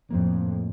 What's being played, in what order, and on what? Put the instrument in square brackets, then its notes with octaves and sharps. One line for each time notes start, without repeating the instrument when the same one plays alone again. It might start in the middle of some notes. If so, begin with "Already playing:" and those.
[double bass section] F2 [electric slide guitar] A2 F3 A#3